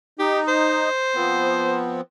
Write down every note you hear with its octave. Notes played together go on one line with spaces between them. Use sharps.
D#4 G4
C5
F3 B3 C4